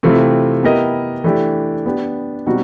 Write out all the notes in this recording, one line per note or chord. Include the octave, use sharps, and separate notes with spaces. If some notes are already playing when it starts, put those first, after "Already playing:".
C3 E3 A3 C4 F4
B3 E4 G4 A#4 D#5
E3 A3 D4 G4
B3 D4 G4
B2 G3 C4 D#4 F#4